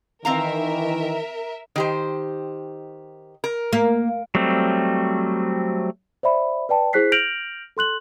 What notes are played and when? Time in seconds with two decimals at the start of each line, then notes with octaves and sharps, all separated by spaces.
0.25 D#3 E3 C4 A#4 E5 F5 A#5
1.76 D#3 G4 C5
3.44 A#4
3.73 A#3
4.35 F#3 G3 A3 C4
6.23 C5 D5 E5 B5
6.69 B4 D5 G5 A5
6.93 E4 G#4 C5 F#6 B6 C7
7.12 F6 G6 A#6 D7 F7 F#7
7.77 A4 C6 F#6 F#7